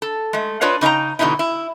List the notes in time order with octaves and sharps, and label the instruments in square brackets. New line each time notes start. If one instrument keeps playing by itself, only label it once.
[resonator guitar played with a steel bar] A4
G#3 A3
D4 F4 B4 C#5 D#5
C#3 D#4 A#4 G5 A#5
E2 B2 D3 D#3 D#4 E4
E4